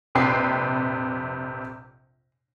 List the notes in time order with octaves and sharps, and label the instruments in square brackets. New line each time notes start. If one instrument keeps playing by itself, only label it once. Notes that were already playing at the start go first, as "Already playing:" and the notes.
[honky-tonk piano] A#1 F2 C3 B4 G5 C7